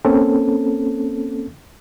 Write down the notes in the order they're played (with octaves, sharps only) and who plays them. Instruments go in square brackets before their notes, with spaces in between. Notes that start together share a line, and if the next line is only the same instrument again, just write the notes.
[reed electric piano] A#3 C4 C#4 A4